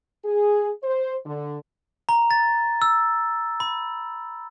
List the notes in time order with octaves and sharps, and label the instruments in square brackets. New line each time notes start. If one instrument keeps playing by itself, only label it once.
[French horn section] G#4
C5
D3
[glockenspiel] A#5
A6
E6
B5